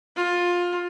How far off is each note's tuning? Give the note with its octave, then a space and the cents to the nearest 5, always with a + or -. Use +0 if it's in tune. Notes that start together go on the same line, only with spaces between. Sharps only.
F4 +15